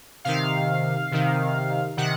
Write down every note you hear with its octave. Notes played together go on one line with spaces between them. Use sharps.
C3 D#3 F5
C3 D#3
C3 D#3 F#5